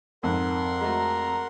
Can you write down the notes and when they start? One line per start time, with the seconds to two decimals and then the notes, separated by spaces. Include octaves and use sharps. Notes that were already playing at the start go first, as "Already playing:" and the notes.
0.23 F2 G#2 A#4 F#5 C6
0.81 G#3 A3 F#4 A#5